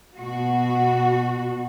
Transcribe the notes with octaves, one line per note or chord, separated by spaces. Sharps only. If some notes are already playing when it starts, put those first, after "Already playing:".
B2 F#4